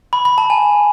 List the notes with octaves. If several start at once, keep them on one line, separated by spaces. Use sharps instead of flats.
B5
B5
A5
G#5